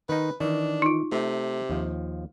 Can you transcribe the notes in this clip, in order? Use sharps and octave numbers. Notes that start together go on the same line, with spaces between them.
D#3 D#4 B4
D#3 E3 D4
D#4 F4
C3 A3
D#2 F3